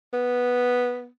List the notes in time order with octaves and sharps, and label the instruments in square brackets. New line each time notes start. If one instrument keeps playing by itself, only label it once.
[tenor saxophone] B3